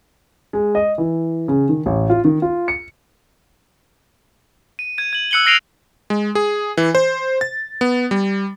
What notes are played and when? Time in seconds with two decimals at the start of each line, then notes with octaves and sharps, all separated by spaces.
0.53 G#3
0.75 D#5
0.98 E3
1.48 C#3
1.69 D#3
1.86 A1
2.10 F4
2.24 D#3
2.42 F4
2.68 C#7
4.79 D#7
4.98 G#6 D#7
5.13 G#6 D#7 F#7
5.31 E6 F#6 C#7 F#7 G7
5.46 F6 A#6 C7 D7 D#7 F7
6.10 G#3
6.35 G#4
6.77 E3
6.95 C5
7.41 A6
7.81 B3
8.11 G3